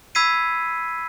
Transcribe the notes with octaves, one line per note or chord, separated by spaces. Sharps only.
B5 E6 G#6 B6 C7 D#7